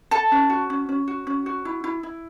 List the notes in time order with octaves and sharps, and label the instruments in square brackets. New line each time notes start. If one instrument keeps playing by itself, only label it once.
[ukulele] A4 A5
C#4
F#4
C#4
C#4
F#4
C#4
F#4
E4
E4
E4